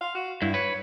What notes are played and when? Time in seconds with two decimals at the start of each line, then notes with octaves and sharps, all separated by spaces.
0.01 F5
0.15 F#4
0.42 G2 E4
0.54 B4 C#5